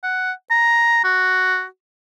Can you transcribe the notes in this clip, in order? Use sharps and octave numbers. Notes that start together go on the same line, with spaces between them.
F#5
A#5
F#4